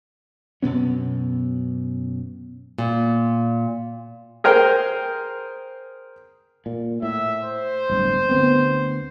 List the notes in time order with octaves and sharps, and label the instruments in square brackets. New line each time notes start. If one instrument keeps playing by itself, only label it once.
[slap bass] F#2 B2 B3 C#4
[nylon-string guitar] A#2
[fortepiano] G#4 A#4 C5 G5
[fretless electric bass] A#2
[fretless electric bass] A2 [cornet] E5
[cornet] C5
[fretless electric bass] D1 G1
D2 B3 C4